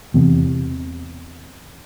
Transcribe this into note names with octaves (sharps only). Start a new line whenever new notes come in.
E2 C3